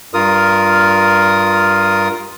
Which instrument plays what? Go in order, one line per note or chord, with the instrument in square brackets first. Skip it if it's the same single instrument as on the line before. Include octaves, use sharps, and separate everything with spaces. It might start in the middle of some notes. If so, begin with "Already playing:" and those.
[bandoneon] G2 F4 A#4 D#6